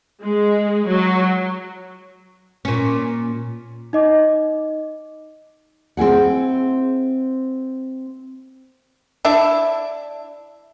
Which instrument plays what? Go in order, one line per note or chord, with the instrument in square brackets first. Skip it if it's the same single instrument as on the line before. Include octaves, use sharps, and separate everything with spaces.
[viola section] G#3
F#3
[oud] A#2 C#4
[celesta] D#4 D#5 D6
[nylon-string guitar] C4 E4 G#4 F#5
[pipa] D4 E4 E5